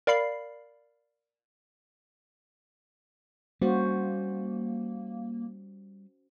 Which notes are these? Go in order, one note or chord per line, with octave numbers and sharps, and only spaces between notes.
A#4 D5 F5 B5 C7
G3 A#3 C#4 F#4 C5